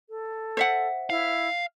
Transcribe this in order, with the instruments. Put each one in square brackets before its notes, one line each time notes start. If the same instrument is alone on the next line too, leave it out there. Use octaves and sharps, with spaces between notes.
[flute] A4
[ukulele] C5 E5 F#5
[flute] E4 [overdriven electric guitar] F5